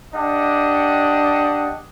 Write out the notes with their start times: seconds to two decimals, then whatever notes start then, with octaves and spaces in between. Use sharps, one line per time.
0.15 D4 G4 D#5 F#5